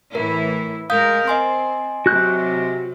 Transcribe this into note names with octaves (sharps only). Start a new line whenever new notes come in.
A2 E3 E4 A#4
G#3 A#4 F5 D#6 G6
C4 D#5 G#5 C6
C3 F#3 F#4 F#6 G6